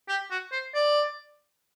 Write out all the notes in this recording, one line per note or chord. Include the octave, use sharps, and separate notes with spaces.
G4
F#4
C5
D5